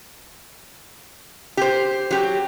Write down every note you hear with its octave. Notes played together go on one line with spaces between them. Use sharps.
G4 C5
F#3 G4